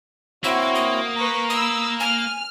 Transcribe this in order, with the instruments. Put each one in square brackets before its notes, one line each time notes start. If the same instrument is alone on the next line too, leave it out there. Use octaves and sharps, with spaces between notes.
[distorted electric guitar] A#3 [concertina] C4 E4 C#5 [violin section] F#4 [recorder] E6
[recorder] D#6
[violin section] B4 C#6 B6 [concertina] A#5
[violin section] B5 E6 [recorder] D#6
[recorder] G#5 [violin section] F6